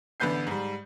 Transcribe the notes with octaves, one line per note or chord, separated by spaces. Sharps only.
A1 D3 B3 B4 G6 C7
G#2 G3